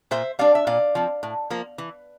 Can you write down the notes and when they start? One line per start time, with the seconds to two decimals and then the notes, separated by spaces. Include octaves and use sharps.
0.11 A#2 C5 E5
0.39 G3 D4 D5 F5
0.55 E5
0.67 A#2 D5 F5
0.95 F3 C4
1.23 A2
1.50 F3 A#3
1.78 E3